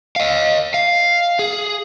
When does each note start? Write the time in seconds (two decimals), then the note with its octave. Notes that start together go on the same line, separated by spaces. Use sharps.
0.16 D#5 F5
0.74 F5
1.39 G#4